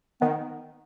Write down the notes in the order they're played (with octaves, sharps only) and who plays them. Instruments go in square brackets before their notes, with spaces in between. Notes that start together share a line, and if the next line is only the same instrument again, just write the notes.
[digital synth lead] D#3 [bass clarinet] B3